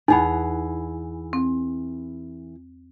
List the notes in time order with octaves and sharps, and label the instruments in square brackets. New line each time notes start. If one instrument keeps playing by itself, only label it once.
[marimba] E2 [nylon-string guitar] E3 G#4 F#5 [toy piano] D#4 B5
[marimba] C4